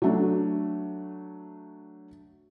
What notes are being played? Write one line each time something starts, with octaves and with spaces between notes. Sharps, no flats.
F#3 A3 D4